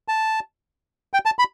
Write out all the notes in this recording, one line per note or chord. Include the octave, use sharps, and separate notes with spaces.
A5
G5
A5
B5